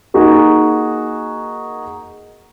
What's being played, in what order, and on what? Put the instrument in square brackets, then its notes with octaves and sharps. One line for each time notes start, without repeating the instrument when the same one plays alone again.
[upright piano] A#3 D#4 F#4 G#4